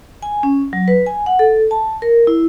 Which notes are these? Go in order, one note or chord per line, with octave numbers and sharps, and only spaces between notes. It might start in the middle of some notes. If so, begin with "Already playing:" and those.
G#5
C#4
F#3
B4
G#5
F#5
A4
A5
A#4
E4